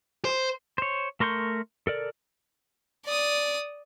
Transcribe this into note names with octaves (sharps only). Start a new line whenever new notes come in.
C5
C5 C#5
A3 A#4 C6 C#6 G6
A4 A#4 D5
D5 D#6